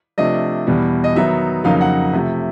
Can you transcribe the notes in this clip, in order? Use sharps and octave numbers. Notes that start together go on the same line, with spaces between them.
C3 F3 A3 D4 D#5
E2 B2 G3
D#5
D#3 F#3 B3 D#4 E5
F2 C#3 F#3 A#3 D#4 F5
F#5
C3 F3 A3